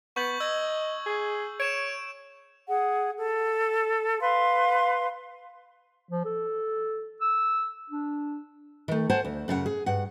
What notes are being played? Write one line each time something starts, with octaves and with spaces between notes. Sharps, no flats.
B3 C#6 G6 F#7
D#5 E6 G#6
G#4
C#5 D7 E7
G#4 F#5
A4
B4 F5 C6
F3
A4
E6
D4
D#3 A3
C5 F#5 G#5 A5
D2
F#2 C#3 A#4 F#5
G#4
G2 F#5